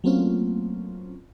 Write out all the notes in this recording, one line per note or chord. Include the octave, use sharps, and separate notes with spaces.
F#3 A3 A#3 C4 C#4 F4